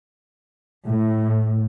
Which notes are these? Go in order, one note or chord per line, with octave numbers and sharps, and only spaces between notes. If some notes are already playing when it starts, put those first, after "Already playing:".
A2